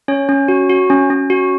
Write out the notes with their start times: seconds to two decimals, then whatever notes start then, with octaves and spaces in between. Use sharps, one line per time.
0.08 C#4 C#5
0.29 C#4
0.48 F#4
0.70 F#4
0.90 C#4
1.10 C#4
1.30 F#4